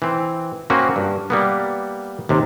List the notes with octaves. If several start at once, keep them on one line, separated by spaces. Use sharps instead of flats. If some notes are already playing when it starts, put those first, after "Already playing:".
E3 C4
A#3 C4 C#4 F#4
G2
G3 A#3 B3
D#2 C3